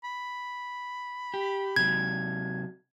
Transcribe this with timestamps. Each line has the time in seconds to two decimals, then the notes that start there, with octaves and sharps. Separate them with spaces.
0.04 B5
1.34 G4
1.76 C3 F#3 G#6